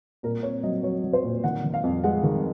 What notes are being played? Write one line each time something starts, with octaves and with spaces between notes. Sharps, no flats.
A#2 A#4
C4 C#5
F#3 D#5
F#3 C#5
F#3
C5
A#2
D#3 F#5
D#3
F5
F2
G#3 F#5
D#3